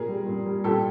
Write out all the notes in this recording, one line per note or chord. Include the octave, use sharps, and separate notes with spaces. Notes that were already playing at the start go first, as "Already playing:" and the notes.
Already playing: A#2 G#4 A#4
G3
A#2
G3
A#2 G4 A4